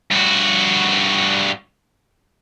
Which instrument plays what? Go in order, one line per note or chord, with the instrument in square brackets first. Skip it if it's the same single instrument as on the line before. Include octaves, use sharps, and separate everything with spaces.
[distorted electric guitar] G2 F#4